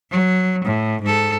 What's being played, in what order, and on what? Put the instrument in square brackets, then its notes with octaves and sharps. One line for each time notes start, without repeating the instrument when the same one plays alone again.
[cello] F#3
A2
G#2 A4